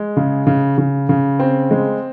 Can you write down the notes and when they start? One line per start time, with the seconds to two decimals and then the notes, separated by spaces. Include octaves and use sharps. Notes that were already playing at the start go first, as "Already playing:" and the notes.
Already playing: G#3
0.17 C#3
0.47 C#3
0.78 C#3
1.09 C#3
1.40 C4
1.71 G#3